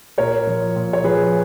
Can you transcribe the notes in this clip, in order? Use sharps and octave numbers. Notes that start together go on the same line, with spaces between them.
A#2 A#4 C#5
F3
A#2
C#5
F3 G#4 B4